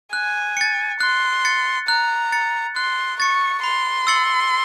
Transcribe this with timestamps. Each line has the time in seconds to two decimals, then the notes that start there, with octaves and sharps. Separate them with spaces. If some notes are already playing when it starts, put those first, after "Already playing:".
0.13 G#5 F#6
0.57 A6 C#7
1.00 C6 F#6
1.45 A6 C#7
1.88 A#5 F#6
2.32 A6 C#7
2.76 C6 F#6
3.19 C#6 A6 C#7
3.63 B5 C6
4.07 E6 A6 C#7 F#7